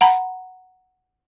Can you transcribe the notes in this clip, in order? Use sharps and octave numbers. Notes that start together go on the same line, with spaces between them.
F#5 A#5 B5